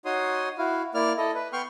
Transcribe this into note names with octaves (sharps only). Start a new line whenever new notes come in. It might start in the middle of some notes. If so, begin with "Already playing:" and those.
D#4 F#4 C#5 C6 D#6
E4 F#4 F5
A#3 E4 D5 F6
E4 A4 D#5
B4
B3 G5 C6 C#6 F6